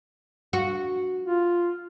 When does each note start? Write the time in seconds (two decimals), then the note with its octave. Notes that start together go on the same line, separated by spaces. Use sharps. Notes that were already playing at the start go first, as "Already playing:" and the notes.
0.53 F#4
1.24 F4